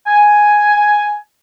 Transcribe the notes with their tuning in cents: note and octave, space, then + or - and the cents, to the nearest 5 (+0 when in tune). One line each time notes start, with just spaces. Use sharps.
G#5 +5